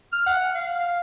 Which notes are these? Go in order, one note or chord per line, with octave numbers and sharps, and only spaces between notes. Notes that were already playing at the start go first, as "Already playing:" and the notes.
F6
F#5
F5
F5